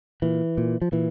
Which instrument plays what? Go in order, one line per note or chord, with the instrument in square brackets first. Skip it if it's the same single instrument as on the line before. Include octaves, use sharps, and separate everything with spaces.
[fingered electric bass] A#2 E3
A#2
F3
A#2 E3